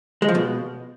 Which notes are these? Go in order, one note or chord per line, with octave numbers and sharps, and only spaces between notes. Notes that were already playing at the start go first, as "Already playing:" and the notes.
G#3
F3
B2